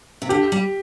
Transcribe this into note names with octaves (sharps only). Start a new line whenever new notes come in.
C3
D3 G4
G3